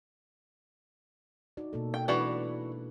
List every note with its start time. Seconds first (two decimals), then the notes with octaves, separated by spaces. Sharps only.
1.57 D#4 F#4 D5
1.73 B2 A#3 A4
1.94 G5
2.08 E3 G#3 D4 F#4 B4 D5